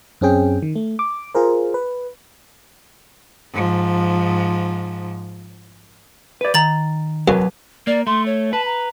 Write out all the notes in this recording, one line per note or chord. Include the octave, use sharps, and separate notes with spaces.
F#2 C4 C#4 G#4 G5
D#3
A3
D6
F4 G#4 A#4 C5
B4
G#2 F3
B4 D5
D#3 A#5 A6 F#7
F#2 F#3 G#4 B4
A#3 D5
A3 C6
C#5
B4 A5
A#5